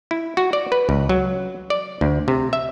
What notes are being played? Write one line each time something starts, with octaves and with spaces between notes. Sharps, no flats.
E4
F#4
D5
B4
C#2
F#3
D5
D2
C3
E5